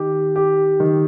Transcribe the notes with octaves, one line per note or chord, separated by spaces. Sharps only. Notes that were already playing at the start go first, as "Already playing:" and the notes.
Already playing: D#3 G4
G4
D#3